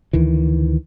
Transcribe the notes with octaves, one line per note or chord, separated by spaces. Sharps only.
D2 D#3 E3